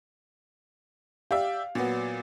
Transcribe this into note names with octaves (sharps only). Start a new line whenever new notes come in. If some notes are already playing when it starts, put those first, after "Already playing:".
G4 D5 E5 F5
A#2 F#3 B3